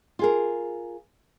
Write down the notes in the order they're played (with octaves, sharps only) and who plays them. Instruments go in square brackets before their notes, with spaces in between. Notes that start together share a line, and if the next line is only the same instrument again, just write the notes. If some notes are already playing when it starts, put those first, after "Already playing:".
[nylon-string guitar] F4 G#4 A#4